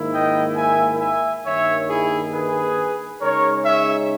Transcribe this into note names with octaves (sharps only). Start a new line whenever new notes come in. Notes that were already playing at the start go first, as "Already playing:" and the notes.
Already playing: G#2 D#3 A#3 E4
D#5 G5
E5 G#5
E5 G#5
G2 D#3 A#3 C#5 E5
E4 G#4
G#4 B4
C#3 G#3 D#4 A#4 C#5
C#5 E5